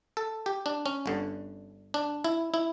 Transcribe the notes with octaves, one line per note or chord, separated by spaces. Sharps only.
A4
G4
D4
C#4
G1 G2 D3
D4
E4
E4